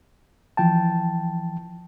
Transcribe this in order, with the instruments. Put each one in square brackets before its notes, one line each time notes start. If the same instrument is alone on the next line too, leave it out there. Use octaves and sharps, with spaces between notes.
[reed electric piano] E3 F3 G5 A5